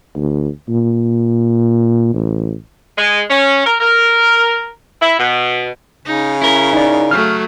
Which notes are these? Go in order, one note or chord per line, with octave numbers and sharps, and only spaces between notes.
D2
A#2
A1
G#3
C#4
A#4
A#4
E4
B2
C#3 D#4
C#4 E4 A#4
D#4 D5
F#3 A3 F6